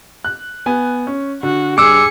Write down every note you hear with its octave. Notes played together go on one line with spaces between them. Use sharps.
F#6
B3 G#5
C#4
D3 F#4
G2 G#4 D6 E6 C#7